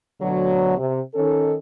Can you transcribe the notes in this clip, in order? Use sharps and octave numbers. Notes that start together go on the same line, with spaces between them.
D2 B2 D3 F#3
C3
D#3 C#4 A4